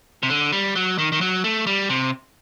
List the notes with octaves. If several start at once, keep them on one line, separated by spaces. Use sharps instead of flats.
C3
D3
G3
F#3
D#3
D#3
F#3
A3
G3
C3